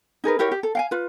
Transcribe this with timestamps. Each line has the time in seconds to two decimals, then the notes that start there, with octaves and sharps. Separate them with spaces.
0.24 D#4 G#4 A#4 B4
0.39 E4 G4 A#4 C#5
0.52 G4
0.63 A4
0.75 F5 G5 G#5
0.91 F4 B4